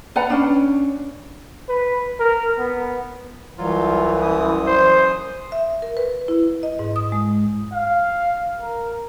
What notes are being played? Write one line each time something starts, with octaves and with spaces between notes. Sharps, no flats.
B4 D5 F#5 A#5
C#4 D4 B5
B4
A#4
B3
C2 E3 F#3 F4
F#2 D#6
C5
E5
A#4
B4
E4
D#5
G#2
D#6
G#3
F5
A#4